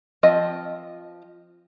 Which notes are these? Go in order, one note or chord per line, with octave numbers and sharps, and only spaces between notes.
F3 C4 D#5